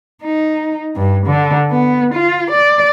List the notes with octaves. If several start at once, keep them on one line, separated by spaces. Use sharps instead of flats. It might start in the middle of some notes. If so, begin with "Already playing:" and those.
D#4
G2
D3
B3
F4
D5